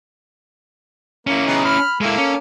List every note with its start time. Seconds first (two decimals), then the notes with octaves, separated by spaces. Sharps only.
1.27 A#3 C#4 E4
1.47 B3 D#4 G#4
1.65 B5 F6
2.01 G#3 A#3 E4 A4
2.18 C#4